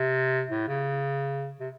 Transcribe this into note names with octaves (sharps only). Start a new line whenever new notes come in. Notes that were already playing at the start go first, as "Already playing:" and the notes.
Already playing: C3
A2
C#3
C3